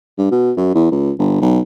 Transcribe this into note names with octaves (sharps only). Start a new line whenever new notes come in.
G2
B2
F#2
E2
C#2
G1
B1